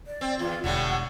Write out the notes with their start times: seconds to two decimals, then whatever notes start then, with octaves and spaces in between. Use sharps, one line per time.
0.07 D5
0.21 C4
0.39 E2 F4
0.64 E1 A2 D3 G3 F#5